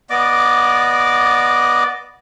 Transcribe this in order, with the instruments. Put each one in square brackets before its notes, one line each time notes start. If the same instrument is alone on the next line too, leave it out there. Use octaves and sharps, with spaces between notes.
[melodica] B3 D5 D#5 D6